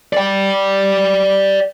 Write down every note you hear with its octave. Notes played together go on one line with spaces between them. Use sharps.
D5 G5